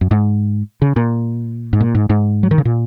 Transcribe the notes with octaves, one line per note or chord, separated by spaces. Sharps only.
F#2
G#2
C#3
A#2
G#2
A#2
G#2
G#2
F#3
D#3
C#3
A#2